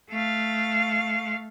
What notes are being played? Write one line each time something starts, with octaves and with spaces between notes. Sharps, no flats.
A3 F5